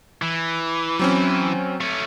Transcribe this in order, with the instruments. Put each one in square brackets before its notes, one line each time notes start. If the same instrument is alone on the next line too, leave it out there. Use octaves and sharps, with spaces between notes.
[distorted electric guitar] E3
[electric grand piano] F#3 C4 C#4
[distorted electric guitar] A3 C#4